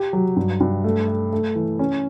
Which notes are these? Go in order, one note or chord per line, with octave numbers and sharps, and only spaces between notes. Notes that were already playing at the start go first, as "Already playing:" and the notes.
Already playing: G4
F#3
G2
G2
A3
A3
A3
E3
C#4